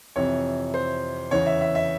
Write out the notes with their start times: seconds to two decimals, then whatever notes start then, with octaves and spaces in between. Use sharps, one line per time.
0.16 F2 C3 E3 C#5
0.74 C5
1.31 E2 C#3 E3 C#5
1.46 E5
1.61 E5
1.75 E5